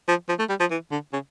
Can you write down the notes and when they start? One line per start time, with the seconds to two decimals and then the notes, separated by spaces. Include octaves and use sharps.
0.08 F3
0.29 F3
0.39 A3
0.49 G3
0.60 F3
0.71 E3
0.91 D3
1.13 C#3